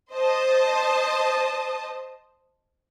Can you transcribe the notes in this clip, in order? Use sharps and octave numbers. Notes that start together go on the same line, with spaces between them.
C5 D#5 A5 D#6